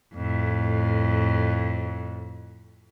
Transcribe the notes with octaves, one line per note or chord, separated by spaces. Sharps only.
F2 A2